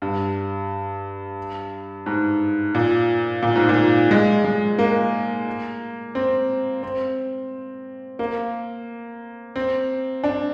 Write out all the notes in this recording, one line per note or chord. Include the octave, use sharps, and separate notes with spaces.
G2
G#2
A#2
A#2
G#2
A#2
G#3
G#3
A#3
C4
C4
A#3
C4
D4